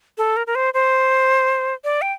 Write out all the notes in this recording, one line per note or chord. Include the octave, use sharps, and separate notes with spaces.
A4
A#4
A#4
C5
C5
D5
G5